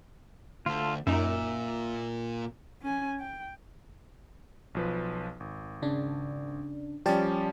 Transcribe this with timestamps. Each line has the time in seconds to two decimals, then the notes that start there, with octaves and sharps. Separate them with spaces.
0.66 D2 F4 A4
1.07 F#2 A#2 D#4 E5
2.82 C#4 G#5
3.20 G5
4.75 B1 F3 B4
5.40 G#1
5.82 C#3 D4
7.06 F3 G3 C#4 G4 D5 A5